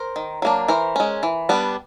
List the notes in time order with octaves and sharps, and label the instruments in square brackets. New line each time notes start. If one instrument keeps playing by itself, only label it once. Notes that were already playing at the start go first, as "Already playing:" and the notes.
Already playing: [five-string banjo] A#4 C5
D#3
F#3 A#3 D4
E3 A#4 C5
G#3 C#4
E3
G3 B3 D4